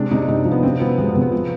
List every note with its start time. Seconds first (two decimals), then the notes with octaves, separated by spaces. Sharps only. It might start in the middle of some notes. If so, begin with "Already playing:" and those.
Already playing: C3 G#3 D4
0.11 C3 D#4
0.28 C3 D#4
0.45 F3
0.51 B3
0.63 C3 C4
0.80 F3 B3
0.98 C3 G#3
1.09 B3
1.15 C3
1.22 B3
1.32 F3